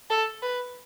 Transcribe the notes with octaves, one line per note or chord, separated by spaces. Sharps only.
A4
B4